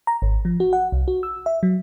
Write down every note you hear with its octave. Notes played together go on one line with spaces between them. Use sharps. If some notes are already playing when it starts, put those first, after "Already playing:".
A#5
G#1
F3
F#4
F#5
C2
F#4
E6
E5
F#3